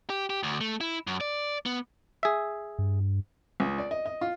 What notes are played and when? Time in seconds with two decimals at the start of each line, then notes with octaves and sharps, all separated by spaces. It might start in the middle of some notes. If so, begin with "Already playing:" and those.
0.10 G4
0.30 G4
0.43 D2
0.61 A3
0.81 E4
1.07 F#2
1.21 D5
1.66 B3
2.23 G#4 E5
2.79 G2
3.60 C#2
3.78 D5
3.91 D#5
4.06 D#5
4.21 F4